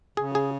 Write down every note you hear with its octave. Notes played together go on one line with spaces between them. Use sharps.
C#3 G#4
G#4